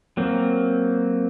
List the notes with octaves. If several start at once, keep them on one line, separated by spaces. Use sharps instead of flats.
F#3 A#3 C4